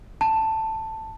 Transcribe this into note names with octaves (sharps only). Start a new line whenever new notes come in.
A5